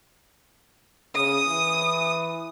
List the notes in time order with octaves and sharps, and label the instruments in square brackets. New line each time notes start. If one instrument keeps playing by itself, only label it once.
[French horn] C#3 [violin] D#6
[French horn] E3